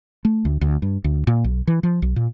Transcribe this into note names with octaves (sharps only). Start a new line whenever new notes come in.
A3
D2
D2
G2
D2
A#2
B1
E3
F3
B1
A#2